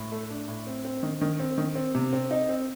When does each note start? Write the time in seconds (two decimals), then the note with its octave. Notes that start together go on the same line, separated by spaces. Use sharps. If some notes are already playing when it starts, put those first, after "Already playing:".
Already playing: A2
0.12 A3
0.30 D4
0.48 A2
0.67 C4
0.85 C4
1.03 D#3
1.21 D#3
1.40 C4
1.58 D#3
1.75 C4
1.95 C3
2.13 C4
2.31 D#4
2.49 C4